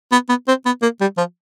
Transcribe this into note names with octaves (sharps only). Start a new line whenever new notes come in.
B3
B3
C4
B3
A#3
G3
F3